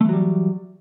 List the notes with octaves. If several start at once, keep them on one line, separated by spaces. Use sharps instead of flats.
E3 F#3 G3 A3